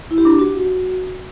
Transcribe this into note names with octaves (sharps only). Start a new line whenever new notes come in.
E4
G4
D4
G4
F#4